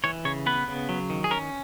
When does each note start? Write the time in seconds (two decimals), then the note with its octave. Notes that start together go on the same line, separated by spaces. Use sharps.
0.04 E3 C#5
0.25 C#3 C#5
0.46 B3 B4
0.67 C#3
0.89 F#3
1.10 D#3
1.24 G#4
1.31 C#4 A#4